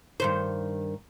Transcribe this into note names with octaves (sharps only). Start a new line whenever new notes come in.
G2 D#3 C5